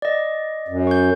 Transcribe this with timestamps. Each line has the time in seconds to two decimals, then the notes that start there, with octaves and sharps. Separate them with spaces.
0.02 D5 D#5
0.68 F#2
0.87 C#6 G6